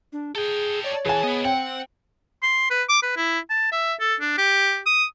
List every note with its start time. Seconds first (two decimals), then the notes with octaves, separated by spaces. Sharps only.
0.13 D4
0.35 G#4 A4 G5
0.84 C#5 D5
1.05 B2 E3 G#4 G#5 A5
1.23 B3 B4 D#5
1.45 C4 F#5 G5
2.43 C6
2.70 B4
2.89 D6
3.03 B4
3.17 E4
3.50 A5
3.72 E5
4.00 A4
4.20 D4
4.38 G4
4.86 D#6